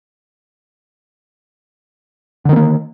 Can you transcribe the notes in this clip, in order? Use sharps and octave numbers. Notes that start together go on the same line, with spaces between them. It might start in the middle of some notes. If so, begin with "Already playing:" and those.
D3 D#3 A#3 C4